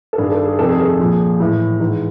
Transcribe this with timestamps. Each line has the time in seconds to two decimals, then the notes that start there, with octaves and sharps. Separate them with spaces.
0.13 A4
0.18 G2 D#3 G#4
0.32 A4
0.45 G#4
0.59 F2 C3 D#3 A4
0.69 G#4
0.80 A4
0.89 G#4
0.99 A#2 F3
1.40 A2 E3
1.80 G#2 E3